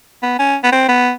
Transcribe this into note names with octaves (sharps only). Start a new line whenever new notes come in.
B3
C#4
B3
C4
B3